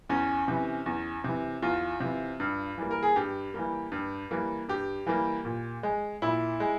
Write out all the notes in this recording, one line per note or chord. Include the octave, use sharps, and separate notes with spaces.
E2 C#4
C3 E3
E2
C3 E3
E2 F4
C3 E3
G2
E3 G3 A#3
A#4
G#4
G2 G4
E3 G3 A#3
G2
E3 G3 A#3
G2 G4
E3 G3 A#3
A#2
G#3
A#2 E4
G#3